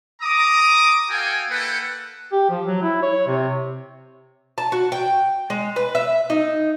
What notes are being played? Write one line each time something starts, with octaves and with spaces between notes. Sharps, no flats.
A#5 D6 D#6
F#4 A4 F5 G5 G#5
A#3 E4 A4 B4 F#5 G5
G4
F3
F#3
E4
C#5
C3
A5
F#4
G5
G#3
B4
E5
D#4